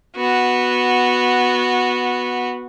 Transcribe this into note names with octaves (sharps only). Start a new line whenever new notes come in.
B3 F#4